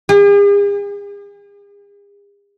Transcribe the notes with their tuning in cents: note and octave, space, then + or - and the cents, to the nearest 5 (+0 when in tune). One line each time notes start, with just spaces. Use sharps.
G#4 -45